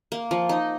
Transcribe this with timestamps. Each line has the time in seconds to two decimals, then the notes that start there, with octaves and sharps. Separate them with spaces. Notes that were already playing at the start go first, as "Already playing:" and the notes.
0.12 A#3
0.31 F3
0.49 D#4